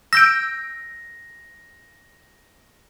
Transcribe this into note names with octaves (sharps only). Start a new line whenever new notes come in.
E6 G6 A#6 D7